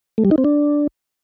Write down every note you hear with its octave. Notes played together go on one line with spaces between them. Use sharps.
A3
G3
D#4
C4
D4